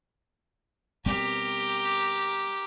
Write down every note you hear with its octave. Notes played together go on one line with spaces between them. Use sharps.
B2 G3 C4 G4 A#4